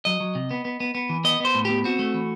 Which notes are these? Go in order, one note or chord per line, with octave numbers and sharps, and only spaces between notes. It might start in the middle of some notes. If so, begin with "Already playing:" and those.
F#3 D#5
F#3
C3
B3
B3
B3
B3
E3
B3 D#5
B3 C5
A2
B3 G4
C4 F#4
A3
E3